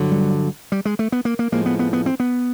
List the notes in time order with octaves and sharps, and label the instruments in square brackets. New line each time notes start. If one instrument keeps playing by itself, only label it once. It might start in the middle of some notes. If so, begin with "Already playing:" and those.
Already playing: [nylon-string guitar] G2 D3 F#3
[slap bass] G3
G3
G#3
A3
B3
A#3
A#3
[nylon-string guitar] A2 F3 G#3 [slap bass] A#3
[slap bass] B3
B3
B3
C4
B3